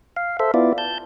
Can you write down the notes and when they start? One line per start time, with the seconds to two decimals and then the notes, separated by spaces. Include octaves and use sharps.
0.16 F5
0.40 A4 C5 E5
0.54 B3 E4 F4 D5
0.78 A5 G6